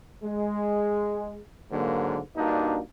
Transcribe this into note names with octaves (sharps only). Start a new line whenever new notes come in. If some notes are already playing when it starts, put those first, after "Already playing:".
G#3
G#2 D3 F#3 A#3
G2 A#3 D4 D#4 F#4